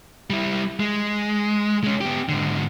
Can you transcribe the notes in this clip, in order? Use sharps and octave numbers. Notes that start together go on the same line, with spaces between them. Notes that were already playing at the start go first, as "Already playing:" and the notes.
G3 E4
G#3
G#3 C#4
B3 G4
G#2 D3